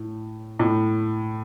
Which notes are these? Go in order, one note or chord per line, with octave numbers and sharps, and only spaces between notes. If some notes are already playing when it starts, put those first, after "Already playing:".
Already playing: A2
A2